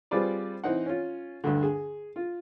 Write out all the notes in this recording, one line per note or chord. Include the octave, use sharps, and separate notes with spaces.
G3 C4 F4 G#4 B4 D5
E3 C4 D#4 F#5
C#4 F4
D2 G2 D3
G#4
F4